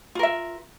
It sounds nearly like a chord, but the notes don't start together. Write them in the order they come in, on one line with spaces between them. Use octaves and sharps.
F4 A#4 E5